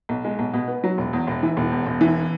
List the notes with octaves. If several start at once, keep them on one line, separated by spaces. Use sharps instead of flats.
B1
G#3
B1
B2
B3
F#3
E1
E2
E1
E3
E1
E2
E1
E3